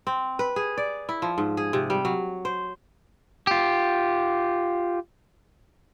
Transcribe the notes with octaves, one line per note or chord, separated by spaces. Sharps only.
C4
B4
G#4
D5
E4
F3
G#2
G#4
C3
G3
F#3
C5
F4 G4